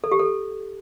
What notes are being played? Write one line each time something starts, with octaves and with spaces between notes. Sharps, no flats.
A4
G4
A4